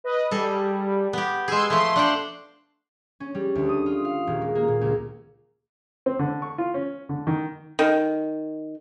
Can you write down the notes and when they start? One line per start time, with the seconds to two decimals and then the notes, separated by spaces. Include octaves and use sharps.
0.04 B4 D#5
0.31 G3 G#4 A4
1.13 B3 G4
1.48 G#3 G#4 C6 E6 G#6
1.70 F3 A3 C6
1.96 D4 F#5 G5
3.20 C#4
3.35 G3
3.55 D2
3.69 D#6
3.86 F4
4.05 F5
4.27 D#1
4.41 G#3
4.55 A#3
4.68 A#2
4.81 C#2
6.06 C4
6.19 D3
6.42 C#6
6.58 F4
6.74 C#4
7.09 D3
7.27 D#3
7.79 D#3